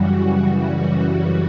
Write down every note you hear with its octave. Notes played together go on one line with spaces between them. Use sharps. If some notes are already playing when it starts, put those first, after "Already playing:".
Already playing: F#2 C#3 E3 G3 F#4
F#4